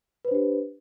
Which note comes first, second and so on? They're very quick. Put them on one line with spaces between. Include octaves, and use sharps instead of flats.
B4 C5 D4 G4